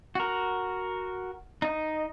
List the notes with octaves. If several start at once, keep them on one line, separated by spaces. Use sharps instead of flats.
F#4 A#4
D#4 D#5